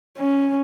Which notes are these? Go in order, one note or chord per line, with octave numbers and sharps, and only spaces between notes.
C#4